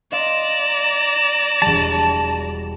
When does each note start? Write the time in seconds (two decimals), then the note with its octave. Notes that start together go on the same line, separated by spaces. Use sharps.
0.12 D5 D#5 F5 A#5 C6 E7
1.62 E1 G3 A5